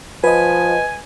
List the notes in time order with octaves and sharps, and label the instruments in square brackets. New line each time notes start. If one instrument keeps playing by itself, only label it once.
[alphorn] F3 [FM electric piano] B4 D#5 [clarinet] G#5